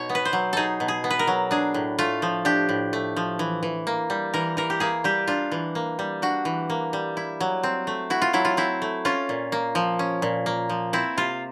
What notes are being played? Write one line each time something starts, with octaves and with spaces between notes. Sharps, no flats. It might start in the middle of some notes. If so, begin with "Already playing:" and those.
Already playing: B2 D#4 C#5
B3
B4
C5
F#3
D#4 G#4 A4
B2
G#4
B3
B4
A#4
F#3
D4 G#4
A2
A3 F4
F3
D4 G4
A2
A3
F3
E3
E3
A#3
G3
E3 A#4
E3 A#4
G4
A#3 G#4
G3 G4
D4 F4
E3
A#3
G3
D4 F#4
E3
A#3
G3
E4
F#3
C4
A3
E4 F#4
F4
F#3 E4
F4
C4 E4
A3
C#4 F4
A#2
A#3
F3
C#4
A#2
A#3
F3
C4 E4
C3 F4